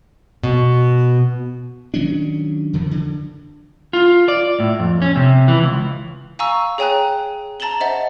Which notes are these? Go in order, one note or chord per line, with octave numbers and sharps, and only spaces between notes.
B2
D#3 F#3 C#4 D4
F2 D3 D#3 F3
D3
F4
D5
A2
F2
C#4
C3
E3
C#2
F5 G#5 A#5 C#6 E6
G#4 C#5 G5 G#5 A#5 F#6
A5 A#5 A6 E7 F#7 G7
C5 D#5 E5 F#5 A6